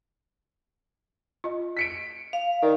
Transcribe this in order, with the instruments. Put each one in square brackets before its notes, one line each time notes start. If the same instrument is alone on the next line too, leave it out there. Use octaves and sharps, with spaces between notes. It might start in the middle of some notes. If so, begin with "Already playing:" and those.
[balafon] F4 D#5
[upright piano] B6 C#7 D7
[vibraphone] F5
[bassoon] D#3 [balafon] D5 F5